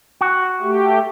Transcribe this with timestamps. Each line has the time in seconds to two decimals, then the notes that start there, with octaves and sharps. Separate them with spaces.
0.21 F#4
0.61 A3 G4